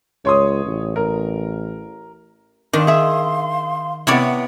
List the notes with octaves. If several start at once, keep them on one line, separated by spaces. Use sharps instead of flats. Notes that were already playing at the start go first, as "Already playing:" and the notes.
C#2 C#5 C6 D#6
A1
A#4
D#3 D4 F5 C6
G#4 E5
C3 B3 E4 C#5 D5